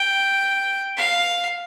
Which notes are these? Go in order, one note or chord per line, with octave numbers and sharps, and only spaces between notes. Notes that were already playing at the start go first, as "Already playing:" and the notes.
Already playing: G5
F5